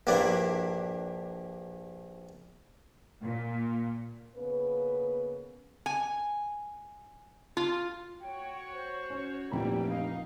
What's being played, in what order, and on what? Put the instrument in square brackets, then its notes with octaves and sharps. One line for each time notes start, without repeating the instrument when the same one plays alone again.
[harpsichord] A#1 G2 G3 A#3 D4 E4
[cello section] A#2
[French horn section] C#3 A#3 B3 B4
[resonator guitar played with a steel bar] G#5
F4
[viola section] F#4 C#5 [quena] G5
[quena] C5
[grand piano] C#4
[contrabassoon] F1 [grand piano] A#1 A#5 B5 [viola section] E3 G3 A#3 [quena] G5
[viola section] D#4 [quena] F5